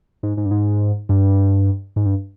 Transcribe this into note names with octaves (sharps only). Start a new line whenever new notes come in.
G#2
G#2
G2
G#2
G2
G#2
G2